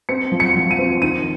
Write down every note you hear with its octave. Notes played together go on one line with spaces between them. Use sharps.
C4 C#7
F3
C#7
F3
D#7
C4
D#3 D#7